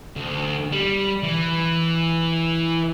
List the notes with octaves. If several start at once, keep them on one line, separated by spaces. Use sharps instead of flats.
D2
G3
E3